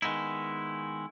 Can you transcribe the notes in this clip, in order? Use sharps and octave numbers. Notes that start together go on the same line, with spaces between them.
D#3 G#3 B3 D#4 E4